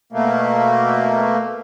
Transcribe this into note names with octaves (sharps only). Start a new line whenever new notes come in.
B2 A3 A#3